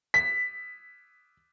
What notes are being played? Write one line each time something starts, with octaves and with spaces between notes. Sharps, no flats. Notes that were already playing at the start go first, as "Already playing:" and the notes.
B6